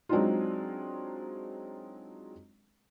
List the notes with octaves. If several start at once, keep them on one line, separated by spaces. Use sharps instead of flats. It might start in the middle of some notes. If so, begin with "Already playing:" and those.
F#3 G#3 C4 D4 D#4 F4